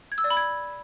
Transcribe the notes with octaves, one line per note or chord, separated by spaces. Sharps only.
G#6
E6
D5
B5
G#6